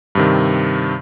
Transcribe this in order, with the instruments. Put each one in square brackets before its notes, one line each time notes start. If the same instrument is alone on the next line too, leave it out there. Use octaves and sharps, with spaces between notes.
[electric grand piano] G2 C3 D#3